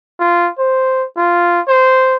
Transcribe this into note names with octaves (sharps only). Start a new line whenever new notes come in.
F4
C5
F4
C5